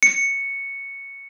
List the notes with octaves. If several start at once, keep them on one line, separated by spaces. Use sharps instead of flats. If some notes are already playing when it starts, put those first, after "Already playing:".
C#7